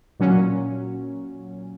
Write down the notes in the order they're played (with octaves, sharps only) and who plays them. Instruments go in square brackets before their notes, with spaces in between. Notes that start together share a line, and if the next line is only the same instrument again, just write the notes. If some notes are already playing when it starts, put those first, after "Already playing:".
[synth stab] A#2 F#3 C#4